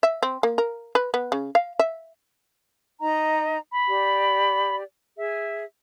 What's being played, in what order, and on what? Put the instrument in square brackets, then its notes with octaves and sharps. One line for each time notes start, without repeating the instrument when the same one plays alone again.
[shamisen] E5
C4
A#3
A#4
B4
B3
C#3
F5
E5
[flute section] D#4 D#5 A#5
[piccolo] B5
[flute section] G4 D5
[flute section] G#4 [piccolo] E5